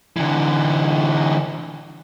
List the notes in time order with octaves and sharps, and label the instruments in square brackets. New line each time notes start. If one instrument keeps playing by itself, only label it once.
[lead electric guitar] D3 E3